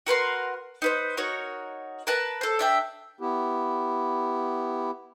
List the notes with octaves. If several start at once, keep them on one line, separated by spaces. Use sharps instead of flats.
F#4 A#4 B4 C6
D#4 B4 C5
D#4 F#4 A#4 C#5
A#4 B4 A5
A4 C5
D4 E5 G5
B3 E4 G4